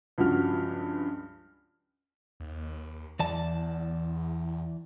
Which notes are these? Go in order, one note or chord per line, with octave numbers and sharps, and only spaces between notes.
C#2 G2 F3 F#4 F6
D#2
E2 E3 D5 A5